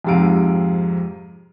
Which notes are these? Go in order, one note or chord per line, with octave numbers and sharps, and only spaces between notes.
F2 G#2 C3 F5 D7